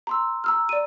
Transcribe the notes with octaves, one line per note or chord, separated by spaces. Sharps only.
A#5 C6 E6
A#5 E6 F6
D5 D#7